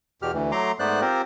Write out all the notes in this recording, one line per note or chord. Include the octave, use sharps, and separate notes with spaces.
E2 B2 G4 F6
D2 E3
F#3 A3 A#5 C6 D6
G#2 A3 B3 C5 D5 F#6
C4 F4 G4 A#4 C5